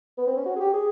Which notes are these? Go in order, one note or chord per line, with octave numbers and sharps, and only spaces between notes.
B3
C4
C#4
F#4
G#4
G4
G#4